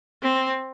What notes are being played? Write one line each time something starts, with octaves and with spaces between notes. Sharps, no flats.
C4